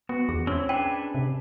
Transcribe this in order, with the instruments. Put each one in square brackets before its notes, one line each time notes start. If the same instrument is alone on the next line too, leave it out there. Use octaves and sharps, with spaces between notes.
[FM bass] B3 [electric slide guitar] F#4
[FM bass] E2 [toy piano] G#4
[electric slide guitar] C4 E4 [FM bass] C#4
[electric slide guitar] D4 G#4 B4 [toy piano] C5 G5
[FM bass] C3